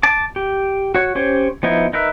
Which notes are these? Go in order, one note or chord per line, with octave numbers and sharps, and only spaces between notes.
A5 D6
G4
F#4 C#5
C#4 G4 C5 C#5
F3 B3 D#4 E4
D#4 A#4 B4 E5